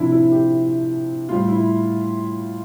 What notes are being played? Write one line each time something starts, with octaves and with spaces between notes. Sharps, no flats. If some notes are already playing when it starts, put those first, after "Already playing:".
Already playing: C3 F3 D4 E4
E4
G4
A2 G3 F4
E4